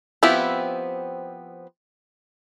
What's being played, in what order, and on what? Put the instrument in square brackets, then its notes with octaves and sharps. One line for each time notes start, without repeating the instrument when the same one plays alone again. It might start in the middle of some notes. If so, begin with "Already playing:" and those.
[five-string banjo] F3 B3 C4 E4 G4